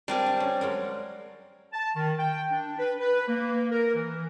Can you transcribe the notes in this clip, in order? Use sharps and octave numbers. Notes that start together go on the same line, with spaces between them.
G3 C4 D4 A#4 G#5
D4
C#4
F#3 G#3 A#4
A5
D#3
G5
D4
B4
B4
A#3
A#4
E3